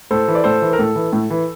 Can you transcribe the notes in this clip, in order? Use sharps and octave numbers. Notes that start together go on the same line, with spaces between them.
A2 A4 C5
E3
D5
A2 A4 C5
E3
A#4
A2 A4
E3
A2
E3